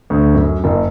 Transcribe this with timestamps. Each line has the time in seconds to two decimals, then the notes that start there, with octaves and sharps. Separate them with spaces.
0.10 D2
0.35 F#2
0.64 F#1